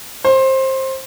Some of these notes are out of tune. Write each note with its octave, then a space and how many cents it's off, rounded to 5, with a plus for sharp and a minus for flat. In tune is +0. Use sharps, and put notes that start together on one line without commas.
C5 +20